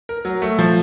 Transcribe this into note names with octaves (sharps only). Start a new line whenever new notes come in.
A#4
F#3
A3
F3